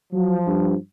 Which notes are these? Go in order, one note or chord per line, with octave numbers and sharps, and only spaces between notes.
F3 F#3
G2